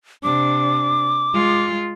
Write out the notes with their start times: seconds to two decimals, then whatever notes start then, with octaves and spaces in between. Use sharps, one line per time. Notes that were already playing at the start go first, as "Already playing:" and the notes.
0.23 C3 D4 D6
1.34 G#3 F4